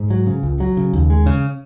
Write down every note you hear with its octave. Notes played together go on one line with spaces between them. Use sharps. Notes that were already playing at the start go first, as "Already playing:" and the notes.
Already playing: G#2
F#3
C#3
C#2
F#3
C#3
D#2
G#3
C#3